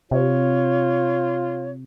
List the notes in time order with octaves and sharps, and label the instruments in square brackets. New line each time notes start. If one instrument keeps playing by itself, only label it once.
[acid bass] C3 [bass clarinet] F4 [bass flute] C#5